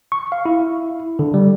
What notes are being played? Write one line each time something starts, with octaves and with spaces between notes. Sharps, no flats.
C#6
F5
E4
D3
G3